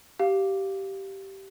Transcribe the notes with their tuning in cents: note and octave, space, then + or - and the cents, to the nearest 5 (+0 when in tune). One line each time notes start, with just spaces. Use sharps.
G4 -15 F5 +0 D6 +0